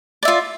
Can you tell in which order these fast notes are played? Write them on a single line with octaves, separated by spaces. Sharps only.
D5 E5 F4